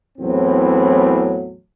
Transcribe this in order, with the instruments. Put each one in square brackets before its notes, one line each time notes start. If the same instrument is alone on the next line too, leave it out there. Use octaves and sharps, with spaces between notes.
[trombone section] E2 A2 F#3 C4